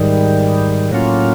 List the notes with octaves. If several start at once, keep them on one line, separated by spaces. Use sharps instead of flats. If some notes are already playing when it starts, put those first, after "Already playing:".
Already playing: G#2 D#3 G3
A2 F#3 A#3 C#4 F4